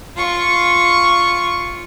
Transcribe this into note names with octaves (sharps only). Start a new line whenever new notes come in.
F4 C#6